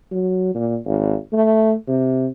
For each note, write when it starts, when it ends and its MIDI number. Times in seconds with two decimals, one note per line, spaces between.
0.11 0.51 54
0.55 0.78 46
0.86 1.15 32
1.33 1.74 57
1.87 2.27 48